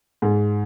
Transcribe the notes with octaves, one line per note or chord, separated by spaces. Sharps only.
G#2